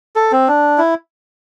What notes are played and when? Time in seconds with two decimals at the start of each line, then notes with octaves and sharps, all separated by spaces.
0.16 A4
0.32 C4
0.48 D4
0.78 E4